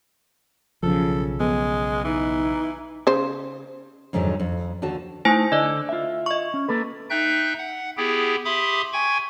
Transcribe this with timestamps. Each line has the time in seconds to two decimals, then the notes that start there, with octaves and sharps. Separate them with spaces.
0.83 B1 C#3 F3 A4
1.40 G#3 B3
2.04 E3 D#4
3.07 C#3 C5
4.13 F2 G#2 D3 D#3 F3 F#3
4.40 F2
4.82 D#2 D3 F#4 A5
5.25 A3 D#4 E4 C5 G#5
5.52 D3 D5 D#5
5.89 F4 E5
6.26 D#5 C#6
6.54 C#4
6.68 A#3 A4 B4
7.10 D#4 E5 G5 F#6 G6
7.58 F#5
7.97 B3 E4 G4 G#4 G5
8.45 G4 E5 B5 C6 D6 D#6
8.93 G5 G#5 C#6 G#6